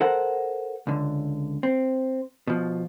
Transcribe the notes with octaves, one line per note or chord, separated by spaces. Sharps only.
A4 A#4 C5 F#5
C#2 D3
C4
B2 F3